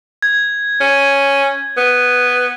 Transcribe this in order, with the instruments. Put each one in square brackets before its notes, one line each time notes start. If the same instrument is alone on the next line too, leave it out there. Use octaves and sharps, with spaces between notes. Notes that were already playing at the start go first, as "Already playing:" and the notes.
[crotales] G#6
[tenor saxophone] C#4
B3